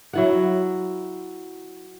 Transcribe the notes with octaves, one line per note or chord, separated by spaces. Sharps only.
F#3 E4 F#5